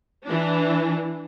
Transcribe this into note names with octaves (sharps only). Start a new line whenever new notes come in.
E3 D4